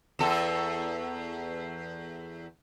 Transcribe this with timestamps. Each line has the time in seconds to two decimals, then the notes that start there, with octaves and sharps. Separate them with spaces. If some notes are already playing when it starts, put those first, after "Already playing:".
0.19 E2 A4